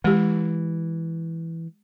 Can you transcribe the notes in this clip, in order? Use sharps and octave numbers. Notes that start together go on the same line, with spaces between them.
E3 G#3 G4